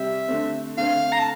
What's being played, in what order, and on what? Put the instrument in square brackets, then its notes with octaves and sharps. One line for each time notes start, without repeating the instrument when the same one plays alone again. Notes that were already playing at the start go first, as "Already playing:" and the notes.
Already playing: [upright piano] C3 G3 G4 [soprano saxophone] E5
[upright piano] D3 A3 C4
[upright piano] D3 A3 C4 [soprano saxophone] F5
[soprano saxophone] A#5
A5